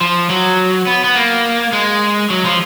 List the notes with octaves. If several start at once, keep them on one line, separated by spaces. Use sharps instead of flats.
F3
F#3
B3
B3
A#3
G#3
F#3
F3